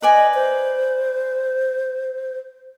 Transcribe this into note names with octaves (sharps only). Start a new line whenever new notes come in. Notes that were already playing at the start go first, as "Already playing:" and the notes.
B4 D5 D#5 G#5
C5